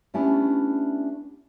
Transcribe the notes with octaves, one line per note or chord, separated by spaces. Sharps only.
G3 A3 B3 C#4 D4 E4